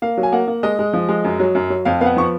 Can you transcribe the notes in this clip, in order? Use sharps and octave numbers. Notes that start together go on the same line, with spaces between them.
A#3 F5
F#3
G#5
A#3 F#5
A#3
G#3 D#5
G#3
F3
G#3
F#2
F#3
F#2
F#3
F2 F5
B3 F5
F#5
F3 C#6